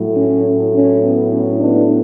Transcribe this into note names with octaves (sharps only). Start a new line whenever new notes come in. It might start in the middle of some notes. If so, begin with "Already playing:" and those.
Already playing: A2 F#3 A3
C#4
C#4
B3
C#4
B3 D4